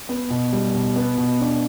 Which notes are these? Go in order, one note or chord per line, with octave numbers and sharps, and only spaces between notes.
B3
B2
G3
B2
B3
B2
D4